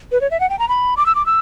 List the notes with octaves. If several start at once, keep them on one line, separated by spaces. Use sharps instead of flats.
B4
C#5
E5
F#5
G5
A#5
B5
D6
E6
D6
E6